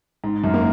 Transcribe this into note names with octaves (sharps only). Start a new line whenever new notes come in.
G#2
F#2
A#3